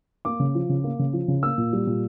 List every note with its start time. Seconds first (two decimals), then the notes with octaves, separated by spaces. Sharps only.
0.25 A#3 D6
0.40 C#3
0.55 F3
0.69 C#3
0.84 A#3
0.99 C#3
1.13 F3
1.28 C#3
1.43 A#3 E6
1.58 A#2
1.73 G3
1.87 A#2